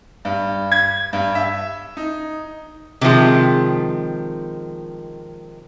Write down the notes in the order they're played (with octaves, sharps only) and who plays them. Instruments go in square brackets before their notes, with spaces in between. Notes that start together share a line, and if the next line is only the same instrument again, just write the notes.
[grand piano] G2
G#6
G2
E5
D#4
[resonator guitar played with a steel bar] C3 D#3 F3 G#3